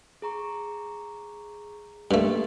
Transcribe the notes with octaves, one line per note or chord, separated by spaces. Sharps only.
G#4 A#5 C#6
G2 A3 A#3 G4 D#5